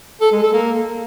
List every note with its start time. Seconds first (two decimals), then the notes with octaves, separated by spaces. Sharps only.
0.21 A4
0.32 G#3
0.42 A4
0.53 A#3